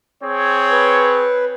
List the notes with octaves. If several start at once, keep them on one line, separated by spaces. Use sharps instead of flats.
C4 G#4 C#5
B4